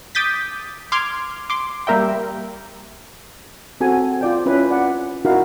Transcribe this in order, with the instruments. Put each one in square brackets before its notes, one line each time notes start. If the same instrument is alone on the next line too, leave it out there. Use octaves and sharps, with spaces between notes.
[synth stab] D6 D#6 G6 A6 B6
C6 D6 F6 G#6
C6 D6
G3 A#3 A#4 E5 G5
[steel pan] C4 F#4 A4 G#5
F4 D5 G5
C#4 E4 B4
D5 F#5
D#4 E4 F#4 A#4 F5